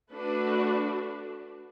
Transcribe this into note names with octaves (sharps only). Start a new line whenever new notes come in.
A3 D4 F#4 B4